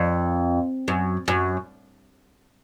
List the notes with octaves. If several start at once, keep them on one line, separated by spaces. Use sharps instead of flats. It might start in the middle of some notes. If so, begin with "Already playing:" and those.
Already playing: F2
F#2
F#2